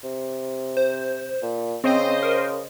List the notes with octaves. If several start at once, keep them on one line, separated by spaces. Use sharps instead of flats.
C3
C5
A#2
C#3 C4 C5 D#5
A#4